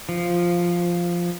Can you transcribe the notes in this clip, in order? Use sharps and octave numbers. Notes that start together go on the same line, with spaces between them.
F3